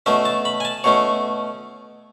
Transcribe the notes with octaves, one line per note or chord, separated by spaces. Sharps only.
B2 A3 C#4 E5
A5
B5
G#5
A5
B2 A3 C#4 C#5